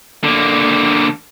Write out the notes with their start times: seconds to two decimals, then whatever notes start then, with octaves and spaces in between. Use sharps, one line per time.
0.24 D3 A#3